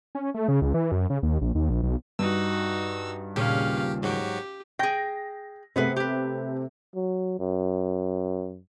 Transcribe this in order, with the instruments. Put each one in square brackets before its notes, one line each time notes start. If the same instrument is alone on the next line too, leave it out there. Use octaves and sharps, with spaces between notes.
[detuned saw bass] C#4
A3
C#3
C#2
E3
F#2
C#3
D#2
A#1
D#2
A#1
B1
[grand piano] G2 [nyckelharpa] D#4 F#4 [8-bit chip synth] E6
[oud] D#2 A#2 C#3 [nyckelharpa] C#4 F5 [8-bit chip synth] G4
[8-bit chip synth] G#2 F#3 F#4 [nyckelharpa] G4
[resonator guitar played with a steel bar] G#4 G5 [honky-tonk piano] A#6
[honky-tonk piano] C3 A3 [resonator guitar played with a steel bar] B3 G#4 B4
[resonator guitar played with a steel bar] G4 B4
[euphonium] F#3
F#2